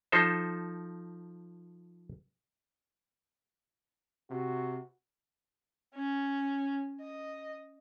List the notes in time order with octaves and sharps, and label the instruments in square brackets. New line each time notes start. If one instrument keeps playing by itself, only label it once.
[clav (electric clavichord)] F3 D#4 A4 C5
[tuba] C3 [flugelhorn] F#4
[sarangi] C#4
D#5